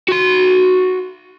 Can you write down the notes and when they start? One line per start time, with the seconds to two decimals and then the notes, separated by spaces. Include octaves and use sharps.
0.09 F#4 C6